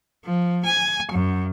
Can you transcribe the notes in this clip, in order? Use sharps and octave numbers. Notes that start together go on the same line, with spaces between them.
F3
G#5
F#2